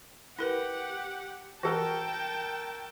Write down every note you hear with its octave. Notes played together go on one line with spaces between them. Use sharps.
E4 G4 A#4 B4 F#5
E3 F#4 A4 A#4 G5 A5